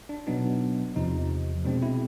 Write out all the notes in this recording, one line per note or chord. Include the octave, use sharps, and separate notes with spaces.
D4
B2 F#3 B3 D4 D#4
E2 C3 F3 D#4
B2 G#3 C4 D4
E4